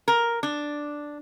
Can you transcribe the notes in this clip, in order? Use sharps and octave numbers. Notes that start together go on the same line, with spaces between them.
A#4
D4